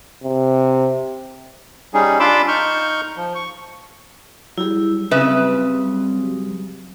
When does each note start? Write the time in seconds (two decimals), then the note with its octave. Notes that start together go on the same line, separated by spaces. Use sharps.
0.24 C3
1.94 G3 C#4 D#4 G#4
2.20 D4 F4 B5 C6 D6 E6
2.48 D#4 C#6 F6 G6
3.17 F3
3.35 C#6
4.58 F#3 G3 E4 G4 G#4
5.11 C#3 C4 B4 E5